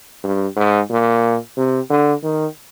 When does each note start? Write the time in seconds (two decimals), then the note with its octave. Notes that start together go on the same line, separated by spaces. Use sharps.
0.23 G2
0.56 G#2
0.90 A#2
1.57 C3
1.90 D3
2.23 D#3